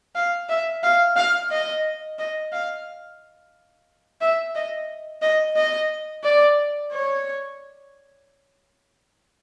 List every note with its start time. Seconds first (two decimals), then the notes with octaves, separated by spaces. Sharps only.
0.15 F5
0.49 E5
0.83 F5
1.16 F5
1.51 D#5
2.19 D#5
2.52 F5
4.21 E5
4.55 D#5
5.22 D#5
5.56 D#5
6.23 D5
6.92 C#5